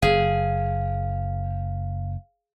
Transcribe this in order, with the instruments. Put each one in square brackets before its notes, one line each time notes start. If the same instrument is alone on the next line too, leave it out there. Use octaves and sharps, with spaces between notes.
[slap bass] F#1 [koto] G#4 [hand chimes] F5